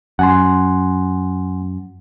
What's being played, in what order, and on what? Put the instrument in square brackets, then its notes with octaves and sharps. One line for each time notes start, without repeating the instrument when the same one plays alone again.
[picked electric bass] F#2 [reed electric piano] F#5 G#5 C6